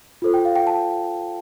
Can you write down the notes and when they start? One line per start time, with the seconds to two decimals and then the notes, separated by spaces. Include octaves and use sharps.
0.22 F4 A4 C5
0.34 G5
0.45 F5
0.56 G5
0.67 A5